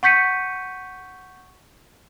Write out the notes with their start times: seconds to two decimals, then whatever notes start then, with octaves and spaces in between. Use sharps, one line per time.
0.03 F#5 C#6 G6 B6 C#7 D#7